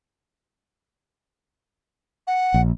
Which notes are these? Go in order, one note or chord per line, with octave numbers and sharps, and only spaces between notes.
F#5
A#1